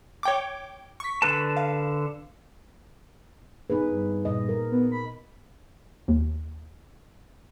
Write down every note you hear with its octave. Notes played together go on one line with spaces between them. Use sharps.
C#5 G5 D6
C#6 B6
D3 B4 A5
F5
D#4 G#4 B4
G2
A#2 D#5
A#4
B3
B5
D#2